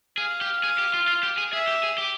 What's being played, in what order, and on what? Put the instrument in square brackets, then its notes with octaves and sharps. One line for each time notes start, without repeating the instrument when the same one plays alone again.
[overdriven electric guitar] G#4 [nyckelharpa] F5
[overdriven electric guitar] G4
G#4
G4
F4
F4
G4
G#4
[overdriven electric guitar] G#4 [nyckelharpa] E5
[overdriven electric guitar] G4
G#4
G4